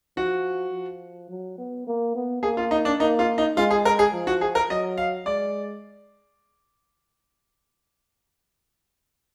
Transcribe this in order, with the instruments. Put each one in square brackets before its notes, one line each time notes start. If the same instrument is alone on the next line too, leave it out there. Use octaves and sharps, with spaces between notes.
[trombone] F3 [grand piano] F#4
[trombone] F3
F#3
B3
A#3
B3
[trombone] A#3 [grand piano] G#4
[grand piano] F4
D#4
D4
[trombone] A#3 [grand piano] D#4
[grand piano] F4
D#4
[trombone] G#3 [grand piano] F4
[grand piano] G#4
A#4
G#4
[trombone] F3
[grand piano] F#4
G#4
A#4
[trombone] F#3 [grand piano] D#5
[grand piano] F5
[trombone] G#3 [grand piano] D5